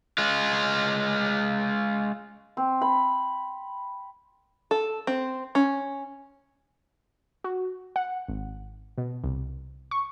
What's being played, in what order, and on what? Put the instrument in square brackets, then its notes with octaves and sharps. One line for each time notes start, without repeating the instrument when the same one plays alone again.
[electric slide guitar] G#3 F4
[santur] C4
B5
[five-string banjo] A4
C4
C#4
[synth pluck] F#4
F#5
G#1
B2
C2
C#6